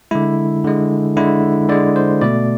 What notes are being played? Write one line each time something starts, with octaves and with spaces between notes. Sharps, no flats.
D3 G#3 E4
D3 G#3
D3 G#3 E4
D3 G#3 D5
C5
B2 A3 D5